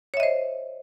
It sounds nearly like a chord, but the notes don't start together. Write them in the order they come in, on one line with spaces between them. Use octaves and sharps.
C#5 E5 D#5 C5